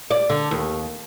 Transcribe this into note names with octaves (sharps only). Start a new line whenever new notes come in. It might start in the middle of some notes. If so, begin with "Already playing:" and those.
D5
D3
D#2